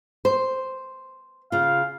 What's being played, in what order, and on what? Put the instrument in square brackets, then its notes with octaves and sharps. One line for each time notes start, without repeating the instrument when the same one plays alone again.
[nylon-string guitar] C5
[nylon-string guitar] C#3 F4 [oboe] F5